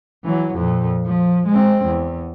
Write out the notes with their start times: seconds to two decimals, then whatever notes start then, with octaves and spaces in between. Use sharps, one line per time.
0.24 E3 F#3
0.55 F2 A#2
1.06 F3
1.47 G#3 C4
1.85 E2